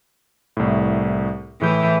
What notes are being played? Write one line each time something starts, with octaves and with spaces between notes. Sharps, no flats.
C2 A2
A2 E3 G#4 G6